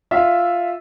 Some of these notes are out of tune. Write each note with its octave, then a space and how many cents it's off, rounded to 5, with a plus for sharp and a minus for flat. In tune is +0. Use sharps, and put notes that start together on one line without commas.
F4 +0 E5 +0